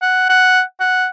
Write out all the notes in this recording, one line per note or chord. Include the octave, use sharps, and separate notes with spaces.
F#5
F#5
F#5